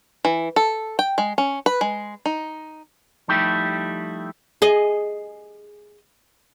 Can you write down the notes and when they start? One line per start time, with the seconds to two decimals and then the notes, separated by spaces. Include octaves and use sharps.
0.25 E3
0.56 A4
0.99 G5
1.18 G#3
1.38 C#4
1.66 B4
1.81 G#3
2.26 D#4
3.28 F3 G3 A3 D#4 E4 G4
4.62 G#4 D#5